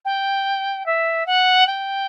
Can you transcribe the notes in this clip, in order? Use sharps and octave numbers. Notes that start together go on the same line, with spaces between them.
G5
E5
F#5
G5